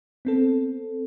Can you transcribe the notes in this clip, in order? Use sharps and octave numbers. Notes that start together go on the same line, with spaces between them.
B3 C4 A4